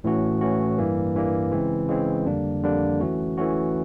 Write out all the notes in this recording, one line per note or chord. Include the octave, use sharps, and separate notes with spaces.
A2 E3 A3 C#4 F#4
A2 E3 A3 C#4 F#4
G2 E3 G3 A#3
G2 E3 G3 A#3
C#3 E3 G#3 C4
C#3 E3 G#3 C4
F2 D3 G3 A#3 D4
F2 D3 G3 A#3 D4
E3 A3 C#4 F#4
E3 A3 C#4 F#4